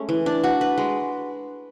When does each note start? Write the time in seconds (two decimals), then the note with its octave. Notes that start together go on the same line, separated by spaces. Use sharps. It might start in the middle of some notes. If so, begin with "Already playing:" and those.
Already playing: G#3 A3 C#4
0.09 E3
0.26 D4
0.43 F#4
0.61 B4
0.78 G#3